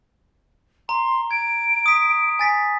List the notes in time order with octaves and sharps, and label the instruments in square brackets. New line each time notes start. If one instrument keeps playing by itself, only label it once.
[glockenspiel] A#5 [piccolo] C6
[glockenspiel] G#6 [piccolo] D7
[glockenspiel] D#6 B6
G#5 A6 B6